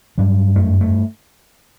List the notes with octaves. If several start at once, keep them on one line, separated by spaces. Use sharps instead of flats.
G2 F#3
F#2 A3
A3